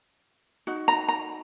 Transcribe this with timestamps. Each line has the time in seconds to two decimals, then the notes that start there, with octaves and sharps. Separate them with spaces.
0.67 D#4 F#4
0.88 A#5
1.09 A#5